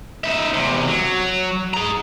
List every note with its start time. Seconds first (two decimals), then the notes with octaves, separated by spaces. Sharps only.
0.24 D#4 E5
0.54 E2 C3
0.87 F#3
1.74 G#4 A#5